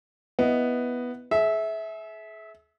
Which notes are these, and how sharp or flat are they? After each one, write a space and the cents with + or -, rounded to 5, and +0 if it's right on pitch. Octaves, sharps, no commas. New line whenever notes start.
B3 +0 E4 +0 D#5 +0
G#4 +40 E5 -15